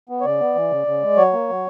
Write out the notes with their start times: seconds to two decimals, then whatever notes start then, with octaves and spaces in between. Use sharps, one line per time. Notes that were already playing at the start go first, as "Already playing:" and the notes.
0.09 B3
0.21 C#5
0.25 C#3 D5
0.40 B3
0.55 E3
0.70 C#3
0.87 C#3
1.02 G#3
1.17 F#3 C#5
1.33 A#3
1.49 F#3